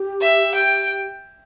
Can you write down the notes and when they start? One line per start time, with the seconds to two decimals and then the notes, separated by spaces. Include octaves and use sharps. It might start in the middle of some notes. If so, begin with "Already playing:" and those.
Already playing: G4
0.21 E5
0.55 G5